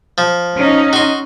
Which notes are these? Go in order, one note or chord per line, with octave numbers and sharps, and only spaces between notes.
F3
C#4 D#4
F#4 C6